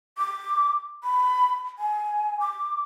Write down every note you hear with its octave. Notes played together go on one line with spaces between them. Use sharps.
D6
B5
G#5
D6